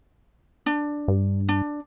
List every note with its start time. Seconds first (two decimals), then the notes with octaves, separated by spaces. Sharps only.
0.66 D4
1.08 G2
1.49 D4